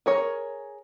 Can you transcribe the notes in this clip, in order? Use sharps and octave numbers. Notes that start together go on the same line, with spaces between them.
G#4 A#4 C#5